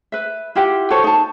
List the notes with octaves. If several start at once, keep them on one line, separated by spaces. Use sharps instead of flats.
B4 E5
E4 F4 G4 F#5
F#4 A4 C5 C#5
D#4 A5